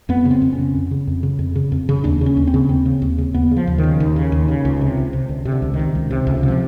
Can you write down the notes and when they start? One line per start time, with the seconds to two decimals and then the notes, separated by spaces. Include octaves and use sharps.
0.09 F2 B3
0.25 C#3
0.31 C4
0.42 F2
0.53 C#4
0.59 C#3
0.74 F2
0.91 C#3
1.07 F2
1.23 C#3
1.39 F2
1.56 C#3
1.72 F2
1.89 C#3
2.04 D#2 D4
2.21 C#3
2.26 C#4
2.37 D#2
2.47 C4
2.54 C#3
2.69 D#2 C4
2.86 C#3
3.02 D#2
3.18 C#3
3.34 D#2 B3
3.51 C#3
3.56 F3
3.67 D#2
3.78 D#3
3.83 C#3
4.00 D#2
4.16 C#3
4.32 D#2
4.48 C#3
4.65 C#2
4.81 C3
4.97 C#2
5.13 C3
5.29 C#2 D3
5.45 C3
5.52 D3
5.62 C#2
5.74 D#3
5.79 C3
5.95 C#2
6.11 C3
6.27 C#2
6.43 C3
6.48 F3